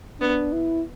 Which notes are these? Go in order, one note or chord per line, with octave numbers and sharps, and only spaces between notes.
B3 D4
E4